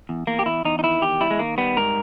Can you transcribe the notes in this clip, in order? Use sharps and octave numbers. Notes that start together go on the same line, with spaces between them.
E2
E2 A#3
G4
E2 E4
E2 D#4
D#4
D#3 E4
E2 G4
G3 E4
G#3
D#3 A#3
G3 B3
G#2 A#4